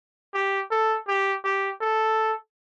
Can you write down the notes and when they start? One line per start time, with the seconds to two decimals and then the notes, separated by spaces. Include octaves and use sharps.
0.34 G4
0.71 A4
1.08 G4
1.44 G4
1.81 A4